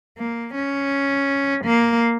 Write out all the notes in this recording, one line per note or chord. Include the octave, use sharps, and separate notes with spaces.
A#3
C#4
A#3